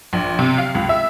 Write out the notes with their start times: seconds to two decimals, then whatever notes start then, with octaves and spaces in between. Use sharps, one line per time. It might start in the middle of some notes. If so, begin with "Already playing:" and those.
0.13 A#1
0.39 C3
0.58 F5
0.75 C#2
0.89 E5